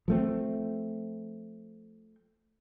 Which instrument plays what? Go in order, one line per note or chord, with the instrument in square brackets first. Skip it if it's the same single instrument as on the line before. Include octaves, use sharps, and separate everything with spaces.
[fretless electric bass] F3 A3 C4